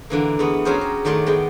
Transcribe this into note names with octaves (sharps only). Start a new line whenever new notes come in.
D3 E3 A#3
E2 A3 B3
F#3 C#4 G4 G#4 A#4 C5
C#4
D#3 F#3 A3 D5 C6
G#3 B3 G5